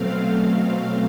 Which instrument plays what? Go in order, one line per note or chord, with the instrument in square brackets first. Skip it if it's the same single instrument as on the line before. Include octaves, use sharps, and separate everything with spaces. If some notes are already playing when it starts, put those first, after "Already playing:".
Already playing: [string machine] B2 F#3 A3 C4 F5